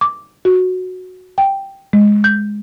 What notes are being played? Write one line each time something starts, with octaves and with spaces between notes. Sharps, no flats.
D6
F#4
G5
G#3
G6